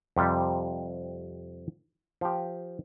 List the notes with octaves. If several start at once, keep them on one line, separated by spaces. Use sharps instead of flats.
F2 C3 G3
F3 G4